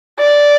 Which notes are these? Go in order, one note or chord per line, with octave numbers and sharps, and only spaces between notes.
D5